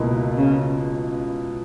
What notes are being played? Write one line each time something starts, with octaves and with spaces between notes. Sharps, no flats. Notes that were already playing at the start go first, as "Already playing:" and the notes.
Already playing: C#2 B2 A#3 E4
C#3